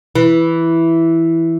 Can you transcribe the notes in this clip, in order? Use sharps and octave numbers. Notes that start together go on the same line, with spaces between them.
E3